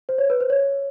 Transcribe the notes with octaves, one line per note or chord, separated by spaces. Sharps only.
C5
C#5
B4
C5
C#5